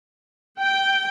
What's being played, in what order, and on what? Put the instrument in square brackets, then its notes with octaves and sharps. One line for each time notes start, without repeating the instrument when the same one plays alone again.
[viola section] G5